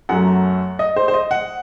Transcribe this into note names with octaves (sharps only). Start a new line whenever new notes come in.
F#2 F#3 A3 F#5
D#5
C5
C5
D#5
F#5